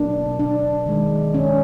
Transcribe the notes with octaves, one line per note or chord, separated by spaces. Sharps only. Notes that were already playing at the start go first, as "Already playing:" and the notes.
Already playing: B2 F#3 A#3 D4
D4
D#3 G#3
C#4